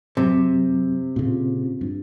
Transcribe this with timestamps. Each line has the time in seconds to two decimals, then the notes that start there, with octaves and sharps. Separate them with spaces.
0.17 F#2 C3 F#3 C4
1.16 A#2 C#3 C4 F4
1.81 G2